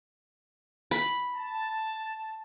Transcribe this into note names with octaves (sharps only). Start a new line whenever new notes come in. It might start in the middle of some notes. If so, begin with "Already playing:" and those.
B5
A5